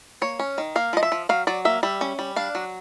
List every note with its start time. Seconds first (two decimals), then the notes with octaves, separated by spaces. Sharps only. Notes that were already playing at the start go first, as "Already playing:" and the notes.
0.22 A#3 C#5
0.39 C#4
0.58 D#3
0.76 A#3 F5
0.93 F3 D#5
1.03 E5
1.12 F3
1.29 F#3 F5
1.47 F#3 D5
1.65 A#3 E5
1.83 G3 E5
2.01 C#4
2.19 G3
2.36 D4 F5
2.55 F#3